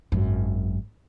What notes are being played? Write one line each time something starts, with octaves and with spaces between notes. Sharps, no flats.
G#1 F#2